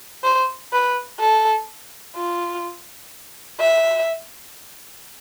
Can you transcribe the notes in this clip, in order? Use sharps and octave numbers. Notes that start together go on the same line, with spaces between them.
C5
B4
A4
F4
E5